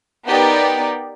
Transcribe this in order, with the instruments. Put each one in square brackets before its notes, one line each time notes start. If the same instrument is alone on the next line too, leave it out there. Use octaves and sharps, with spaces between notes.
[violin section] B3 D#4 G4 A#4 D5